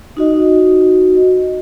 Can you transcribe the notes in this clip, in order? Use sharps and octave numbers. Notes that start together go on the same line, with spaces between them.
D#4 F#4 D#5